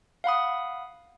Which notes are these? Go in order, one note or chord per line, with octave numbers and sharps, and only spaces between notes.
F5 F#5 B5 D#6